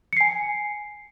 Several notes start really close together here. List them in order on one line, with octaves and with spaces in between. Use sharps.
C#7 C7 G#5